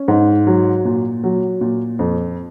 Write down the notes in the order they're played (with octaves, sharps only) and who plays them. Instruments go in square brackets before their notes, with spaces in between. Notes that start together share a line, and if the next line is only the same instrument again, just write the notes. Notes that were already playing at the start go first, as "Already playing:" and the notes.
Already playing: [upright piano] C#4
G#2
F#3
A#2
F#3
A#2
F2